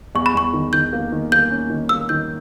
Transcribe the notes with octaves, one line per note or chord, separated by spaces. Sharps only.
E2 C#6
B5
E2 C#6
D#3
D#3 G6
A#3
D#3
A#3 G6
C#4
D#3
A#3 E6
D#3 G6